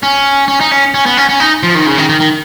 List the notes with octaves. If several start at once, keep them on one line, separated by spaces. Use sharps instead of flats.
C#4
C#4
D#4
C#4
C#4
B3
C#4
C#4
D#4
F3
D#3
C#3
D#3
D#3
D#3